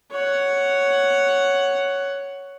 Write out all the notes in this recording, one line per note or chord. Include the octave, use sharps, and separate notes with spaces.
C#5 F#5